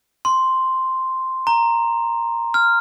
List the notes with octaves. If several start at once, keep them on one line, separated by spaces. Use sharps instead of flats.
C6
A#5
F6